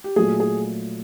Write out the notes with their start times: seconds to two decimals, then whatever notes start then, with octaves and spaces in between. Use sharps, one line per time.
0.04 G4
0.16 A#2 F#3 A3 G#4
0.40 G#4